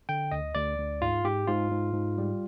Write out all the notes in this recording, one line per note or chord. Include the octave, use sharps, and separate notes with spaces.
D3 G5
D2 D#5
D2 D5
D2
G#2 F4
G#2 G4
G#2 F4
G#2
G#2
G3